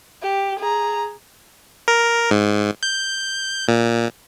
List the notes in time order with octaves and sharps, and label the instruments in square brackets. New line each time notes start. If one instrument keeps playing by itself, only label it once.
[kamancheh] G4
G#4 A#5
[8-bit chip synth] A#4
G#2
G6
A#2